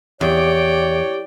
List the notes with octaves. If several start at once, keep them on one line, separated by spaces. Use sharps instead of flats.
E2 G4 C#5 D5 G5